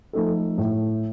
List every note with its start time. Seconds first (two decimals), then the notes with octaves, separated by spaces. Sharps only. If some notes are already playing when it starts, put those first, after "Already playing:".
0.13 F3 A3 D#4 A4
0.58 A2